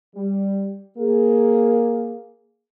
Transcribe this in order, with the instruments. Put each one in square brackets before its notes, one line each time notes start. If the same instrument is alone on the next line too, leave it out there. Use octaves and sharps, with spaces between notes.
[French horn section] G3
A#3 G#4